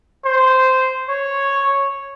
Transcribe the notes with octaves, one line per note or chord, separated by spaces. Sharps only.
C5
C#5